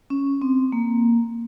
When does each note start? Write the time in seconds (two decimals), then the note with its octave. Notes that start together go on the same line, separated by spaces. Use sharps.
0.10 C#4
0.42 C4
0.72 A#3